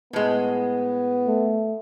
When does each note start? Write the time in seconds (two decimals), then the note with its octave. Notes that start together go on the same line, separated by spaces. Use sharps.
0.13 A2 G#3 B3
1.27 A3